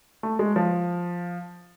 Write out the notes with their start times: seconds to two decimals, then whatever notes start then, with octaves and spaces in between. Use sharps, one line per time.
0.23 A3
0.39 G#3
0.56 F3